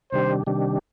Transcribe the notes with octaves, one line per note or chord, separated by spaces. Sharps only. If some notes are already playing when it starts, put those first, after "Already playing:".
C3 D#3 G3 D4 G4 C5
C3 D#3 G3 D4 G4